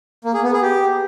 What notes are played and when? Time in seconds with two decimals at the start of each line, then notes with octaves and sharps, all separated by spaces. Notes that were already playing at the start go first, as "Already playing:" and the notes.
0.25 A#3
0.34 G#4
0.43 B3
0.53 G#4
0.62 G4